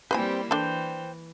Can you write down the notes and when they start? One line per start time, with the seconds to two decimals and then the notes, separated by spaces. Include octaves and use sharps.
0.11 G3 A#3 C4 E4 G4 B4 C5 G#5
0.51 E3 D4 A4 C5 G5